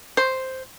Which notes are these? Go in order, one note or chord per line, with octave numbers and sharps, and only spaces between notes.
C5